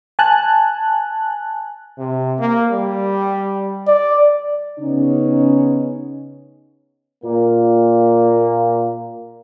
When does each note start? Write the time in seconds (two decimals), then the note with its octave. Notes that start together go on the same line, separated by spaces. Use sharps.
0.19 G#5 A5 F#6
1.98 C3
2.39 A#3
2.71 G3
3.88 D5
4.80 C#3 B3 C#4 D#4
7.23 A#2 A#3